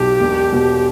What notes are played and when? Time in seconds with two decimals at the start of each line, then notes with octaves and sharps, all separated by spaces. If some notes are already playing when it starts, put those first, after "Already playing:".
Already playing: B1 G4
0.21 E1
0.52 B2